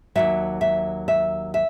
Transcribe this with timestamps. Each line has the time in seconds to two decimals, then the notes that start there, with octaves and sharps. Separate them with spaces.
0.15 D#2 D#3 F#3 E5
0.61 E5
1.08 E5
1.54 E5